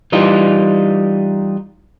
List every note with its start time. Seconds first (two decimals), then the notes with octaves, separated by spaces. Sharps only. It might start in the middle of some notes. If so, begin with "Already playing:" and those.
0.12 E3 G3 D#4 F4